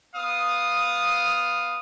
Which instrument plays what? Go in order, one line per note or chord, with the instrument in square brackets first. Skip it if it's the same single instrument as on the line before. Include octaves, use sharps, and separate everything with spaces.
[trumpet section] B3 F5 D#6